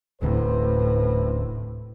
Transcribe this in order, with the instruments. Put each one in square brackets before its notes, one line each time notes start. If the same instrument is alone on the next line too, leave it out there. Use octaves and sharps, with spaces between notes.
[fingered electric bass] D1 D2 C3 [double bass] A2 [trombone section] B4 C5